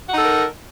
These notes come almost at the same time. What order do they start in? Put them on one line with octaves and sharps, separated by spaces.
F#5 D#4 A4 A#4